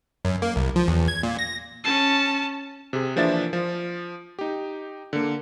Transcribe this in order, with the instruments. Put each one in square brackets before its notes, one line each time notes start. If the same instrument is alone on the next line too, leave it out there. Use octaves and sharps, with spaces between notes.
[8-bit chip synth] F#2
A#3
C2
F3
E2
G#6
A#2
A#6
[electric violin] C#4 A5
[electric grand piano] C3 G#4
E3 F3 A#3 D4 E5 A6
F3
D#4 G4
D3 A#3